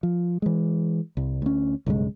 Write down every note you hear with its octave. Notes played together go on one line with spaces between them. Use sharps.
F3
E3 G#3
C2
D2 C#4
B1 G2 C#3 G#3